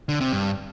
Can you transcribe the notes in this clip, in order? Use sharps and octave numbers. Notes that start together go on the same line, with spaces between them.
D3
C3
G2